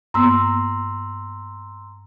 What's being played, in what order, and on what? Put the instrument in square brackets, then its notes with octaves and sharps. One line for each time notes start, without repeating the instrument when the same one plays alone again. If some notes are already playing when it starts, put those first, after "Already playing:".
[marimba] G2 A#3 B3 [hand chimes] A#5 C6 E6